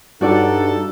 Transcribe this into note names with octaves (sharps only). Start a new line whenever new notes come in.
G2 D#4 F#4 A4 D5 F#5